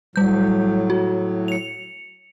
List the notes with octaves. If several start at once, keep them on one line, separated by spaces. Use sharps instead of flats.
A2 F#3 G3 G6
F#4
C#7 F7